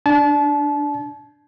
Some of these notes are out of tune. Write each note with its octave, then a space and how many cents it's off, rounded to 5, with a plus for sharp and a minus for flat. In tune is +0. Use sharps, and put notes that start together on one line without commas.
D4 +0 A5 -30